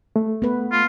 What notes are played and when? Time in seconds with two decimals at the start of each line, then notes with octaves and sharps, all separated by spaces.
0.16 A3
0.42 B3 B4
0.72 F4